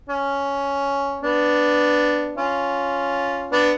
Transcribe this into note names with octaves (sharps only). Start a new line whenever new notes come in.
C#4
B3 D4
C#4 F4
B3 D4